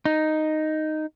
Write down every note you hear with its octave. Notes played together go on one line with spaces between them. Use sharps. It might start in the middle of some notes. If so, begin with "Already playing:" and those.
D#4